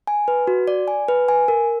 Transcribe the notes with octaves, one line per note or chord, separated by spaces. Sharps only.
G#5
B4
F#4
D5
G#5
B4
G#5
A#4